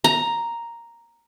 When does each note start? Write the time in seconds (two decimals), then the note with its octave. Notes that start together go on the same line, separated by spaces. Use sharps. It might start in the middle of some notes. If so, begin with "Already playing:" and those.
0.04 A#5